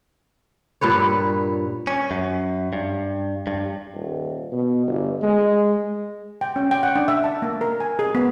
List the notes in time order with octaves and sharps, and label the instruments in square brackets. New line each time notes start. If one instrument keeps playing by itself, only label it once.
[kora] G2 A#2 B4 C#5
[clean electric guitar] C#4
F#2
G2
G2
[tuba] D#1
B2
G1
G#3
[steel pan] G5
C#4
G5
F#5
D4
E5
A5
A#3
A#4
G#5
G#4
B3